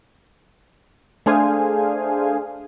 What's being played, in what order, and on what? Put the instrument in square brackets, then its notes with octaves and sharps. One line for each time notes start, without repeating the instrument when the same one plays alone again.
[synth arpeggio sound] A3 D4 G#4 C5 F5 G#5